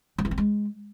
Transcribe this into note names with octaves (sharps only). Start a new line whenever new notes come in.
F#3
E3
C4
G#3